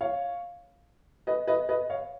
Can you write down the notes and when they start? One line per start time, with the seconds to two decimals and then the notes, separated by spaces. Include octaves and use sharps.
0.01 C#5 F5
1.27 B4 D#5
1.47 B4 D#5
1.69 B4 D#5
1.90 C#5 F5